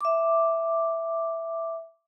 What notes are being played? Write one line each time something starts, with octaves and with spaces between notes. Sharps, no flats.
E5 D6